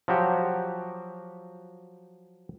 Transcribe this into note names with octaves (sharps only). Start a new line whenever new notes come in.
F3 F#3 F#4 G4